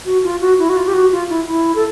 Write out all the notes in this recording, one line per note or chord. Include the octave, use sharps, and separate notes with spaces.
F#4
F4
F#4
E4
F#4
F4
G4
F#4
F4
E4
E4
A4